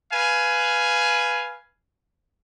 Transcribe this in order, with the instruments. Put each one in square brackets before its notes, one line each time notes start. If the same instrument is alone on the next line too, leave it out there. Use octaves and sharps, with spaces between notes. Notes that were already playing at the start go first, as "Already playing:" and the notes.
[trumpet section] B4 F5 G#5